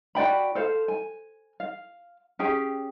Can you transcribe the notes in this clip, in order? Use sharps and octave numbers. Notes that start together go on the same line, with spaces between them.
F#4 D5 G5 B5
A4 C5 F5
G#5
F5
C#4 G4 G#4 G5